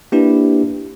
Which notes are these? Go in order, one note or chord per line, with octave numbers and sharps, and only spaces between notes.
A#3 D4 E4 G4 B4